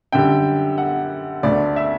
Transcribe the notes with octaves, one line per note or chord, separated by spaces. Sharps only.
F#2 D3 G3 G5
F#5
D2 D3 A3 D5
E5